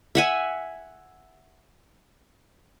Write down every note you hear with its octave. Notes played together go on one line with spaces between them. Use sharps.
E5 F#5 G#5